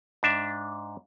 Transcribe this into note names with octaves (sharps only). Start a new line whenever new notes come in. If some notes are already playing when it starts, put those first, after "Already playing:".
G#2 D4 E5